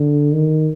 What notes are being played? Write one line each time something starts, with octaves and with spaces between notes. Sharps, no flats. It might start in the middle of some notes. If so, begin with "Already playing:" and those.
Already playing: D3
D#3